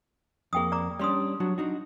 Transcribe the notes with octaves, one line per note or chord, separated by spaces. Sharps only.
F2 A#3 G#4 G5 D#6
D5 A#5 D6
G3 C#4 D4 D5 C6 D#6
F#3 D4 F#4
D4 D#4 F#4